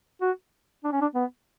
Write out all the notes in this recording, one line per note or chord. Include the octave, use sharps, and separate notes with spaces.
F#4
D4
C#4
D4
B3